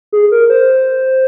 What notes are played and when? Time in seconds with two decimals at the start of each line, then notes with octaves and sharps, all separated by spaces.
0.12 G#4
0.31 A#4
0.50 C5